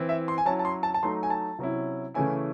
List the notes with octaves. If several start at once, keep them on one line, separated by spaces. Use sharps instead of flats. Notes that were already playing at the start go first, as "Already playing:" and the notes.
Already playing: E3 C4 E4
E5
C6
G#5
F#3 C#4 E4 A5
A5
C6
A5
A5
F#3 A3 D#4 C6
G#5
A5
C3 F#3 C#4 E4
C#3 E3 A3 C#4 E4 G#5